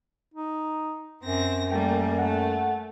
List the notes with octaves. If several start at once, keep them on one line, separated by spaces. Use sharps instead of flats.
D#4
F#2 C4 A#6
G3 A3 A#3 G5
A3 F#5